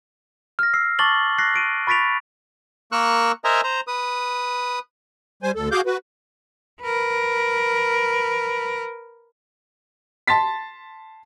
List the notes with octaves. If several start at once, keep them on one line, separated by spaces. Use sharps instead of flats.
F6 A#6
E6 C7
A5 C#6 D6 A6 F#7 G7
F#6 A#6 C7
C7 D7 D#7
B5 C#6 A6 B6 D7 F7
A#3 A#4 C#6 E6 F#6
A#4 C5 D#5 E5 G#5 A#5
C5 A#5
B4 D#6
G3 C5 G#5
D2 A4
F#4 G#4 F5 D6 G6
F#4 B4
A#4 B4
A5 C6 A6 B6